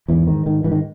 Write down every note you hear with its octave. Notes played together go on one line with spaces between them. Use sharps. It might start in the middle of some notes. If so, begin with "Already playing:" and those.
E2 G#2 E3
G#2 D#3
G#2 D#3
G#2 E3
D#3